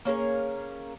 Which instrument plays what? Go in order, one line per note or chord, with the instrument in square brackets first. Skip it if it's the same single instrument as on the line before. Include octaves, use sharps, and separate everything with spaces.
[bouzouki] A#3 C#4 G#4 A#4